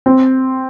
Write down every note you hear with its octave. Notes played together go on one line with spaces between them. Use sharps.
C4